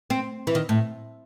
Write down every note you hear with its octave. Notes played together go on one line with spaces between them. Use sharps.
C4
E3
D#3
A2